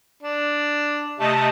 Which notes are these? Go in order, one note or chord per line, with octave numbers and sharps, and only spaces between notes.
D4
C3 A3 D#5 A5